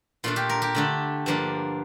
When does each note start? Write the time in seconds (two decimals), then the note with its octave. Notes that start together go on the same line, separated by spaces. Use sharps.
0.24 A#2 A3 D4 F4
0.36 G4
0.49 A#4
0.62 G4
0.75 D3 A3 D4
1.26 G2 F3 A#3 D4